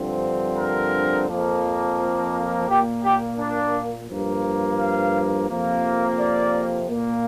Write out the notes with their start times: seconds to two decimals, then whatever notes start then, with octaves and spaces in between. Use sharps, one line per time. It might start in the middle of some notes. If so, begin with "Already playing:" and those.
Already playing: G2 D3 F3 C4
0.58 A#4
1.28 F2 F3 A#3
2.68 A#2 A#3 G4
3.03 G4
3.38 D4
4.08 G2 F3 A#3
4.79 F5
5.49 F2 C3 F3 A#3
6.19 D5
6.89 A#2 A#3